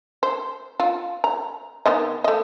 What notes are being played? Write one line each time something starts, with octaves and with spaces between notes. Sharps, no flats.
C5
F4
A#5
D#3 B3 D#5
A3 D#5